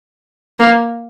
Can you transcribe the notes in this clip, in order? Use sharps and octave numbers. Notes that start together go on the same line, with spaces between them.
A#3